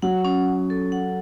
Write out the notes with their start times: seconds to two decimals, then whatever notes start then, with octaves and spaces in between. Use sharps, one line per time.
0.02 F#3 F#5
0.25 C#4
0.48 C#4
0.70 A4
0.92 F#5